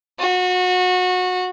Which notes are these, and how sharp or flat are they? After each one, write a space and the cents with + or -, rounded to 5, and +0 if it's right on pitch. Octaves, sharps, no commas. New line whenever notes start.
F#4 -25